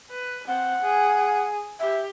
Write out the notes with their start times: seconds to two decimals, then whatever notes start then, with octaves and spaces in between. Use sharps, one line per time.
0.11 B4
0.48 C4 F#5
0.82 G#4
1.80 G4 E5